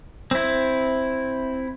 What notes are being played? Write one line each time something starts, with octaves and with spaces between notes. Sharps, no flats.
C4 E4